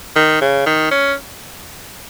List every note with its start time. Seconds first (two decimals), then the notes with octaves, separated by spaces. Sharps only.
0.16 D#3
0.41 C#3
0.66 D#3
0.91 C#4